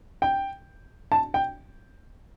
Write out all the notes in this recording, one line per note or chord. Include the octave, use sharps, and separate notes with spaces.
G5
A5
G5